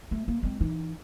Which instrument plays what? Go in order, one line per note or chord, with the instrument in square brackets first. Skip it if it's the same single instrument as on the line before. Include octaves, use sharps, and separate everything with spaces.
[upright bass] A3
A#3
G#3 C4
E3 D#4